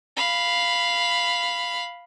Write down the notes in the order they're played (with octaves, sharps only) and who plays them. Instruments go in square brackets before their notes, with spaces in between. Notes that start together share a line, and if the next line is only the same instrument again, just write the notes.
[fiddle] F5 B5